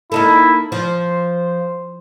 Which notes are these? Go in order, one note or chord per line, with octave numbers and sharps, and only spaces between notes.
A#3 D#4 E4 A4
F3 C5